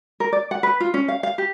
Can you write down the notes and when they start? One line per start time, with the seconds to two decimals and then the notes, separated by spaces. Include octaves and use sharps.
0.20 A#4
0.33 D5
0.51 F#5
0.63 B4
0.80 F4
0.94 C#4
1.08 F5
1.23 F5
1.38 G4